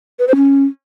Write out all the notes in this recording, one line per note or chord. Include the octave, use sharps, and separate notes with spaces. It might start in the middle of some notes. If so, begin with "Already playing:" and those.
B4
C5
C#4